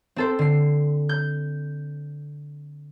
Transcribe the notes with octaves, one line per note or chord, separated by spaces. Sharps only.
C4 A4 C5
D3 C7
G6